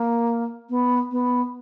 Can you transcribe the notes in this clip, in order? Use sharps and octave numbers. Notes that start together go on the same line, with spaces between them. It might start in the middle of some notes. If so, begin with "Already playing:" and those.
Already playing: A#3
B3
B3